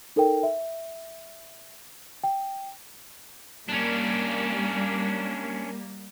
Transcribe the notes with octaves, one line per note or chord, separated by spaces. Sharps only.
D#4 A4 A#4 G5
E5
G5
G3 A#3 C#4 D4